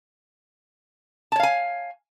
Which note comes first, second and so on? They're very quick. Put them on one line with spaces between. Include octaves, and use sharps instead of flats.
A5 C#5 F5 G#5